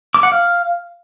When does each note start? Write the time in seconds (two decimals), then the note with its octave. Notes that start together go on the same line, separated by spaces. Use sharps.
0.14 D6
0.23 F#5
0.32 F5